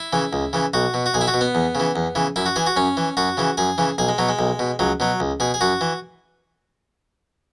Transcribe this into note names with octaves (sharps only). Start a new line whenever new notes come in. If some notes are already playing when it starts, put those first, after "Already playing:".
Already playing: E4
C#3 E3
C#2
C#3 E3
B1 F#4
B2
F#4
B1 G#4
E4
F#4
B2
B3
E2
C#3 E3
E2
C#3 E3
F#2 E4
F#4
E3 G#4
F#4
F#2 C#4
E3
F#2 F#4
C#3 E3
F#2 G#4
C#3 E3
B1 G#4
G#3
B2 F#3
G#3
B1
B2
C#2 F#3
B2 F#3
C#2
B2 G#4
G#4
F#2 F#4
E3